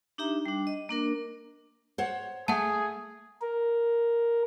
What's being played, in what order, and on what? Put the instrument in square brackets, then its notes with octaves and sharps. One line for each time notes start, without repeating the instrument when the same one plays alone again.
[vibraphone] D4 D#4 G4 E5 A#5
G3 D4
D#5
A#3 D4 A#4
[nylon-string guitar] C5 C#5 F#5
[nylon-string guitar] A3 [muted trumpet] G#4 [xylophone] F#5 A5
[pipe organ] A#4